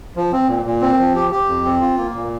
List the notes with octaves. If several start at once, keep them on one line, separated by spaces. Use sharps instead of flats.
F3
C4
A#2
A#2
C4
F3
G4
G4
F2
C4
F4
A#3
A#2